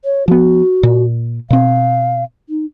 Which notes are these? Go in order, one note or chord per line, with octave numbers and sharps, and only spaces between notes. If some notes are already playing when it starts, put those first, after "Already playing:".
C#5
F3 B3 F#4
A#2
B2 C4 F5
D#4